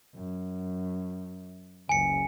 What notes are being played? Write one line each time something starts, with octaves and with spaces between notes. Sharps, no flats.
F#2
F#1 C#2 G#5 C#7